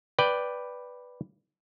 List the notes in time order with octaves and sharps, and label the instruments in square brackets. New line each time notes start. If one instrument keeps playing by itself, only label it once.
[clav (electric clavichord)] B4 D5 G5